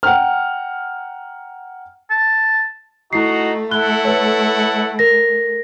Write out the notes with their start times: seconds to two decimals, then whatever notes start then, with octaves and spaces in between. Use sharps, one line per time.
0.03 F#5 G5 A#5 F6
2.10 A5
3.13 A3 D#4 E4 F#4 C7
3.71 E4 A4 F#5 F#6 G7
4.05 B4 C#5
4.99 A#4 A#6